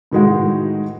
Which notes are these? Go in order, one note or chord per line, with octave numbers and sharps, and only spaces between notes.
A2 D#3 E3 G#3 D#4 F#4